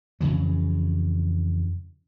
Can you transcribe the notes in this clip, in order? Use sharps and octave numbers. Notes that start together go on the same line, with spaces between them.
F2 C#3 E3 F#3